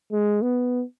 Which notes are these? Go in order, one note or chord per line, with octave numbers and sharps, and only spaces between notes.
G#3
B3